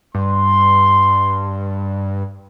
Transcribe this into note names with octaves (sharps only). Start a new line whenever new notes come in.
G2 C6